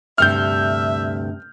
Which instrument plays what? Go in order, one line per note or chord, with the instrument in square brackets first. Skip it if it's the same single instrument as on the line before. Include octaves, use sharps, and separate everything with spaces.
[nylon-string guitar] D2 G2 C3 [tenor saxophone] E5 [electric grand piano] F6 G6